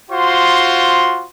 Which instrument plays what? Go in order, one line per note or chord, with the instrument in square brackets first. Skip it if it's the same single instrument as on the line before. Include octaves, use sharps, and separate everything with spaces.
[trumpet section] F4 F#4 C5 C6